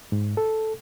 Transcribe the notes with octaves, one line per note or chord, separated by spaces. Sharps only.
G#2
A4